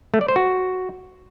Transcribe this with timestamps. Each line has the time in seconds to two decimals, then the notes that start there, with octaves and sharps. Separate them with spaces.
0.14 A3
0.21 D5
0.28 C5
0.36 F#4